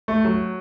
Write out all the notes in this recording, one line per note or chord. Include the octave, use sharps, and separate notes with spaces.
A3
F#3